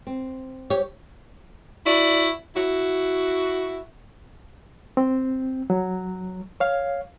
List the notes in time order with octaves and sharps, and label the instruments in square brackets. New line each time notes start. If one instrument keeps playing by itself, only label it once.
[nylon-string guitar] C4
[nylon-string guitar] G4 [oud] C#5
[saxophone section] E4 F#4 D5
E4 F#4
[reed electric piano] C4
F#3
C#5 F5